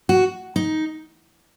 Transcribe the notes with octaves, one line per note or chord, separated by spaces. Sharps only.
F#4
D#4